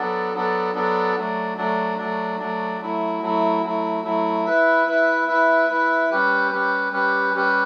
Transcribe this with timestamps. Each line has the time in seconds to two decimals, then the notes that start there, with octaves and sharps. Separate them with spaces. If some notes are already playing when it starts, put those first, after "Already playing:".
Already playing: F#3 B3 D4 A4
0.34 F#3 B3 D4 A4
0.74 F#3 B3 D4 A4
1.16 F#3 A3 D4
1.57 F#3 A3 D4
1.98 F#3 A3 D4
2.39 F#3 A3 D4
2.81 F#3 A3 E4
3.22 F#3 A3 E4
3.63 F#3 A3 E4
4.04 F#3 A3 E4
4.45 E4 B4 E5
4.87 E4 B4 E5
5.28 E4 B4 E5
5.69 E4 B4 E5
6.10 G3 C#4 G4 B4
6.51 G3 C#4 G4 B4
6.93 G3 C#4 G4 B4
7.34 G3 C#4 G4 B4